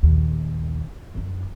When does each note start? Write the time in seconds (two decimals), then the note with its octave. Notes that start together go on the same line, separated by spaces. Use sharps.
0.03 A#1 D#2
1.15 F#2 D4